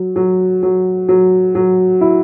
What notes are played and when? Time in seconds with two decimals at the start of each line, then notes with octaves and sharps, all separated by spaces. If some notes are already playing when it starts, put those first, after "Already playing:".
Already playing: F#3
0.16 F#3
0.63 F#3
1.09 F#3
1.55 F#3
2.01 E4